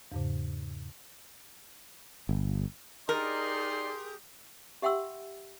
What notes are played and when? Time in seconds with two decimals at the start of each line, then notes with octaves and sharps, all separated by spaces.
0.12 E2 G#2 C#3
2.29 G1
3.09 D#4 G4 G#4 A#4 D5 C6 G6
4.82 G4 E5 F#5 G5 C6 E6